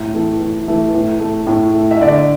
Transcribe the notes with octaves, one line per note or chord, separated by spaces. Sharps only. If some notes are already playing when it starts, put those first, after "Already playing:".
Already playing: A2
E3 A3
A2
E3 A3
A2
A3
A2
A3
E5
D3 D5